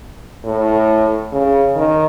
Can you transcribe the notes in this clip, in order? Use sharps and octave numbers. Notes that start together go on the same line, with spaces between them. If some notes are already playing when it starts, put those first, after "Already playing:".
A2
C#3
D#3